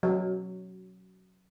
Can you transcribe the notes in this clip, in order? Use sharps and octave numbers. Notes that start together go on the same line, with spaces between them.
F#3